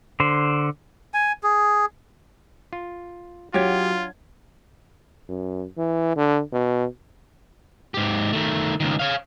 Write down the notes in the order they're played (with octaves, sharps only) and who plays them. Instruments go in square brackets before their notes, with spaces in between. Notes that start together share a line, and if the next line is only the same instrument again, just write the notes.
[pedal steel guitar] D3 C5
[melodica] G#5
G#4
[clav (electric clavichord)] F4
[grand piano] F#3 G#6 [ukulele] D4 C#5 F#5 [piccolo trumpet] F4 [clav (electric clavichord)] G4
[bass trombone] F#2
E3
D3
B2
[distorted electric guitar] G#2 G4
D#3 A3
C#2 D#3
C#5 F5